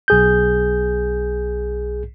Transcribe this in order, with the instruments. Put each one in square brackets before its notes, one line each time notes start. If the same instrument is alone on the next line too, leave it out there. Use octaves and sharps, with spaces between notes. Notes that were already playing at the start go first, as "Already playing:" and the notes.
[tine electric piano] B1 G#4 G6